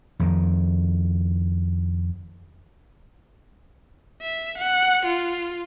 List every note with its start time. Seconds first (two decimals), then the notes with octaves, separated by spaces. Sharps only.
0.19 F2 D#3
4.22 E5
4.58 F#5
5.06 F4